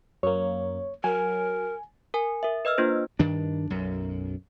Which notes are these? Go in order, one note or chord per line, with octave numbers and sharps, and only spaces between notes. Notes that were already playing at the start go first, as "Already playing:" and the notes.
F#2 A#3 C#5
F#3 A#4 G#5
A#4 G#5
A#4 E5
B4 D#5 E6 F6
A#3 D4 F4 C5
G2 D#3 D4
B1 F#2